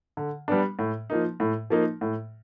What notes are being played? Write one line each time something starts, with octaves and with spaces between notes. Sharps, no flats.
D3
G3 B3 D4
A2
F3 A#3 D#4
A2
F3 A#3 D#4
A2